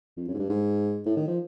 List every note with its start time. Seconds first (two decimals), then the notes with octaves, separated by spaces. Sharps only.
0.17 F2
0.28 F#2
0.34 G#2
0.39 G2
0.50 G#2
1.06 A2
1.17 D#3
1.28 F3